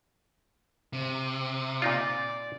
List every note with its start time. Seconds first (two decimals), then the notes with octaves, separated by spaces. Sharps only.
0.93 C3
1.82 A#2 D#4 F4 D5